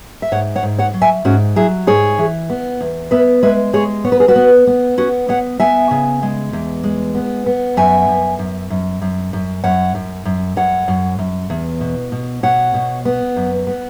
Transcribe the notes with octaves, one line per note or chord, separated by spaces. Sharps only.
E5
G#2 C#5 F#5
C#5 F#5
G#2
C#5 F#5
F#3
E5 G#5
G#2 C#4 F#4
F#3 E4 G#4
G#2 G#4 C#5
E3
B3
E2
B3 B4 E5
G#3 B4 E5
G#3 G#4 C#5
B3 C#5
B4
G#4
F#4 B4
B3
B3
B3 C#4 F#4
B3 C#5 F#5
B3 E5 G#5
C#3
G#3
E2
G#3
B3
B3
F#2 E5 G#5
F#2
F#2
F#2
F#2
F#2
F#2 C#5 F#5
F#2
F#2
F#2 C#5 F#5
F#2
F#2
E2
B2
B2
B2 C#5 F#5
B2
B3
F#2
B3